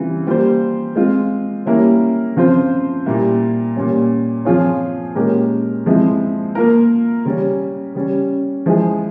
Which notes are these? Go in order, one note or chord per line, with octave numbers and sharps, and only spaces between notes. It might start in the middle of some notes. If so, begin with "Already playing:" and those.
Already playing: C#3 E3 G3 C4 F4
G3 A#3 F4 C5
G#3 C4 F4
G3 A#3 C#4 E4 A#4
C#3 F3 C4 F4 C5
A#2 G3 A#3 E4
A#2 G3 C#4
F3 C4 F4 G#4 C#5
A#2 G#3 C#4 G4 A#4
F3 G#3 C4 E4
A#3 F4 A#4
C#3 G3 C#4
C#3 G3 C#4
F3 G#3 E4 G#4